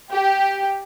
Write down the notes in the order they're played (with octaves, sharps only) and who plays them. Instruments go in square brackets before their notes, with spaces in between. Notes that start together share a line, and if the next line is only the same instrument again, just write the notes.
[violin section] G4